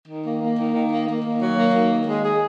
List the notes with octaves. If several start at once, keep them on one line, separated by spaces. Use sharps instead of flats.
D#3
A#3
A#3
D#3
D#3
A#3
A#3
D#3
F#3
A#3
D#3
D#3
G#3
G#4